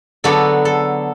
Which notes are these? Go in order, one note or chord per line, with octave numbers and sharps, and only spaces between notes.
D3 F#3 B3 D4 A4
A4